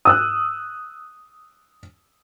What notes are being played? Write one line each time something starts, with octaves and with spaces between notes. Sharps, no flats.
D#6 E6 F#6